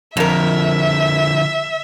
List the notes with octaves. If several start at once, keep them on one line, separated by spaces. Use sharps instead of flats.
F2 D3 F3 A#4 E5